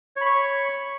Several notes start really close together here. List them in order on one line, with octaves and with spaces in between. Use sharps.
C#5 B5 C#6